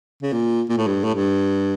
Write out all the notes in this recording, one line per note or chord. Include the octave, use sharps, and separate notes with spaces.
C#3
A#2
A#2
A2
G2
A2
G2